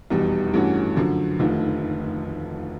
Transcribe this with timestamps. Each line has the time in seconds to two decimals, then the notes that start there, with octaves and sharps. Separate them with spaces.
0.10 F1 E2 B2 G3
0.54 G2 E3 A3 C#4 F#4
0.97 F#2 D3 F3
1.39 F1 D#2 D3 F3 A3